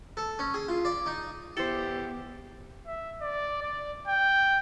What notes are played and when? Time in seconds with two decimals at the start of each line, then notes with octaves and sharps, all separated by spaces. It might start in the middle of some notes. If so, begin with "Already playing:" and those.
0.17 A4
0.39 C#4
0.54 G#4
0.68 F4
0.85 D5
1.06 D#4
1.57 E2 E4 G4 A4 C5
2.86 E5
3.22 D5
3.63 D5
4.08 G5